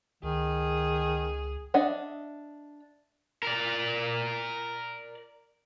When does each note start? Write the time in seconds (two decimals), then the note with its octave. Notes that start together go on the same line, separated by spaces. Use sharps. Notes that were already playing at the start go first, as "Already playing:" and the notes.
0.23 C#2 D#3 G#4
1.74 D4 D#5 E5 F#5
3.43 A#4 D5